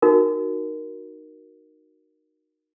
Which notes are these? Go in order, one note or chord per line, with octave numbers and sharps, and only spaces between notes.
D#4 F#4 A#4